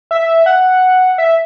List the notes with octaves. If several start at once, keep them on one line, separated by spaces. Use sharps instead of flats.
E5
F#5
E5